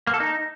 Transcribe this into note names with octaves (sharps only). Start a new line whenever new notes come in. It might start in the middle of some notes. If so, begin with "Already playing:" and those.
A#3
A4
D#4